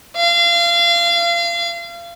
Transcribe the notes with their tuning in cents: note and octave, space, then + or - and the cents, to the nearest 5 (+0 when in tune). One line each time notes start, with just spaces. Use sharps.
F5 -30